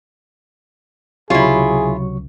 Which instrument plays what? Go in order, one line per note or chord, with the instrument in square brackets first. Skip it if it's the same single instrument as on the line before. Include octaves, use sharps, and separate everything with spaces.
[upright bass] C#2 [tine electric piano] C3 F#3 C#6 [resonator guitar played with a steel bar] E4 F4 [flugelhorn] G#4